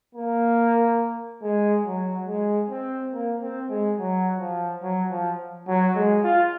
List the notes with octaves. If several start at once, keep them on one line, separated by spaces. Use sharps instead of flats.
A#3
G#3
F#3
G#3
C4
A#3
C4
G#3
F#3
F3
F#3
F3
F#3
G#3
F4